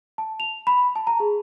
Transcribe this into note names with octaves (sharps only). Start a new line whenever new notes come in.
A5
F7
B5
A5
A#5
G#4